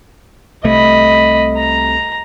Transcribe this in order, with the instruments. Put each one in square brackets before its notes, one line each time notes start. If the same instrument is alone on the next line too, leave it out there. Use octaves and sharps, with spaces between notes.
[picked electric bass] C2 C3 A3 [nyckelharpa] D#5 B5
[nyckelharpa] A#5